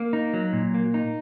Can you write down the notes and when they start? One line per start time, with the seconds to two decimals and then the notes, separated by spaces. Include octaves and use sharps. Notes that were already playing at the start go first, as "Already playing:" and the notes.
Already playing: A#3
0.13 D#4
0.34 F#3
0.53 A#2
0.74 A#3
0.94 D#4